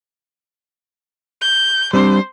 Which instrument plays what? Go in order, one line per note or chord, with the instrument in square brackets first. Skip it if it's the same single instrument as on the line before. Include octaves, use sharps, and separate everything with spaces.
[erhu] G6
[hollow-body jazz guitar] G3 C4 D4 [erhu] C5